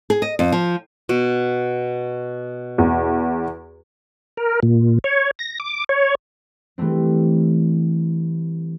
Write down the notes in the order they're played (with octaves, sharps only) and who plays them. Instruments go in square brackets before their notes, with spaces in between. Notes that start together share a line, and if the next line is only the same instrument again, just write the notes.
[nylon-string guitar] G#4
D#5
F2
F3
[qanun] B2
[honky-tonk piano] E2
[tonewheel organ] A#4
A#2
C#5
A#6
D6
C#5
[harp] E3 G3 A3 C4